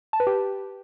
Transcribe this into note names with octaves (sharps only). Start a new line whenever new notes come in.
A5
B4
G4